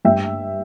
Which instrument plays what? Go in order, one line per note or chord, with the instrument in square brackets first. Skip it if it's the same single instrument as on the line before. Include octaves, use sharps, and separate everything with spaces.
[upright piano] G2 E5 G5